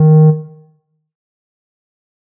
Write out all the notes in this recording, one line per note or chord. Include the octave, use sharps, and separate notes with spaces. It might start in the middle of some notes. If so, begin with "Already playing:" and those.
Already playing: D#3